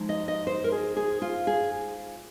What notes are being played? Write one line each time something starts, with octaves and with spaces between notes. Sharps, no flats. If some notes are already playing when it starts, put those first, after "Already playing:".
Already playing: F3 G#3 D#4
D#5
D#5
C5
A#4
G#4
G#4
F4
G#4